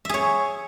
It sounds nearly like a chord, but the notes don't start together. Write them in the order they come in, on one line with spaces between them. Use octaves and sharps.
E5 G#4 C#5